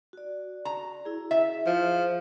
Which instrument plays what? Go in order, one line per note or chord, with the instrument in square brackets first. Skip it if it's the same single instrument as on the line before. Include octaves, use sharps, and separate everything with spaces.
[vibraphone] F#4 D5
[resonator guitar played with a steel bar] A#5
[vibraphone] E4 G#4
[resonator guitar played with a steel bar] E5
[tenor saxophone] F3